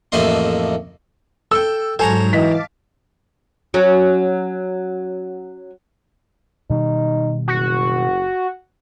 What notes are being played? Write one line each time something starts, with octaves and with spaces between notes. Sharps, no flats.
A1 F2 A3 A#3 D#5 C6
A4 G5 E6
G#2 F#3 A4 C5 C#5 G#5 A#5
E3 D#5 F5 A5 D6 B6
F#3 C#4
B2 D#3 G3 D#4
F#1 F#4